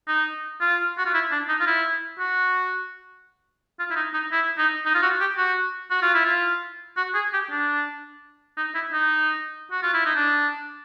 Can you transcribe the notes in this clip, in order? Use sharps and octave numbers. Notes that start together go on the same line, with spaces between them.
D#4
F4
F#4
F4
E4
D4
D#4
F4
E4
F#4
F4
E4
D#4
D#4
E4
D#4
D#4
F4
F#4
G4
F#4
F#4
F4
E4
F4
F#4
G#4
G4
D4
D#4
E4
D#4
F#4
F4
E4
D#4
D4